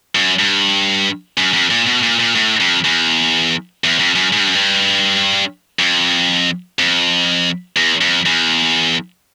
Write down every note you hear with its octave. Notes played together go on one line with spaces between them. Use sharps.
F#2
G2
F#2
F2
A#2
B2
A#2
A#2
A2
F2
E2
E2
F2
F#2
G#2
G2
F#2
G2
F2
F2
E2
F2
E2